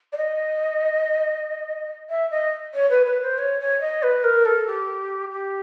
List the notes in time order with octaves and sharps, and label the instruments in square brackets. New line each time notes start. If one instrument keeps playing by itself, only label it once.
[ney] D5
D#5
E5
D#5
C#5
B4
B4
C5
C#5
C#5
D#5
B4
A#4
A4
G4
G4